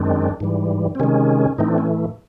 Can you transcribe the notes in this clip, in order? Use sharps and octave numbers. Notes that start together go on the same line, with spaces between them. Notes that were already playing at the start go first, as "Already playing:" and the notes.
Already playing: F#2 D#3 G#3 C4 D4
G#2 E3 G3
C4
C3 D#3 G#3 C#4
A2 E3 A3 C4 D#4
D4
C#4